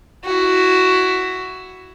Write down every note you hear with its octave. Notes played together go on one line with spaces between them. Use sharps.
E4 F#4